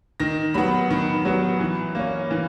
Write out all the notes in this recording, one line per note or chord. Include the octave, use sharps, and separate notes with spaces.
D#3 A#6
F#3 B3 B5
D#3
F#3 B3
E3
A#3 C#4
E3